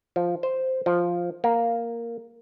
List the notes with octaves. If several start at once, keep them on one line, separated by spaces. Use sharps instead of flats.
F3
C5
F3
A#3